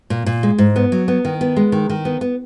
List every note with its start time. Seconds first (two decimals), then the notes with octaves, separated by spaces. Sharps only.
0.10 A#2
0.26 A#2
0.43 G#3
0.58 G#2
0.76 B3
0.92 F#3
1.08 B3
1.25 D#3
1.41 B3
1.56 G#3
1.72 D#3
1.89 D#3
2.05 B3
2.21 B3